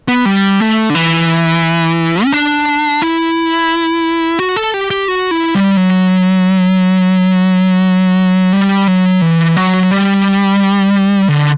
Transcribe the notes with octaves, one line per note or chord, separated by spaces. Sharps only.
B3
G3
A3
D3
E3
C#4
D4
E4
F#4
A4
G4
G4
F#4
E4
G3
F#3
G3
F#3
E3
F#3
G3
D3